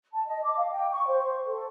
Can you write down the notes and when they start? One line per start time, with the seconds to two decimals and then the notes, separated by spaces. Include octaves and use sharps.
0.13 A5
0.27 D#5
0.44 D6
0.57 F5
0.72 G5
0.92 C#6
1.08 C5
1.47 A4